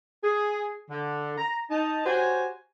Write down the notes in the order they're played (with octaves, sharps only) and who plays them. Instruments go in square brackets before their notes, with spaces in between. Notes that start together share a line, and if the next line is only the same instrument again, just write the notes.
[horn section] G#4
D3
A#5
D#4 A5
F#4 G4 C5 C#5 G#5